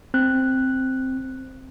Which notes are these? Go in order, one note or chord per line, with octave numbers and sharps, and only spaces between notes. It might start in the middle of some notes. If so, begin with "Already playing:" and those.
C4 F#6